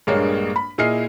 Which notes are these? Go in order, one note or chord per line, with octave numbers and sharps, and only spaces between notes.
A#1 G2 G#3 A#3 C#5
B5
A#2 E4 G#4 D#5 F6 C7